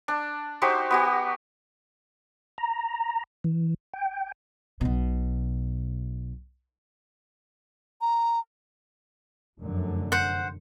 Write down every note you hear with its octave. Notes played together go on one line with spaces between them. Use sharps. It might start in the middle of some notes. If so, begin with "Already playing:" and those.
D4
D#4 F#4 G4 C5
B3 F#4 G4
A#5
E3
G5
B1 B2
A#5
F1 F#2 D3
C5 F#5